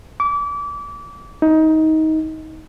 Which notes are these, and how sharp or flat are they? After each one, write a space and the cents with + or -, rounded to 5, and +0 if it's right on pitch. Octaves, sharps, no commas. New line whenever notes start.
D6 -30
D#4 +20